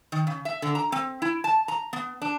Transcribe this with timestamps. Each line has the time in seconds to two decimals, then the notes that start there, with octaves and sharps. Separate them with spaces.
0.12 D#3
0.27 C#3
0.45 E5
0.62 D3
0.75 A#5
0.92 C4
1.22 E4
1.44 A5
1.68 A#5
1.93 B3
2.22 D4